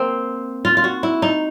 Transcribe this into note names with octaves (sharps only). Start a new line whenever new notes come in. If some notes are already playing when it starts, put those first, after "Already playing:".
Already playing: A#3 C4
F4
F4
F#4
E4
D#4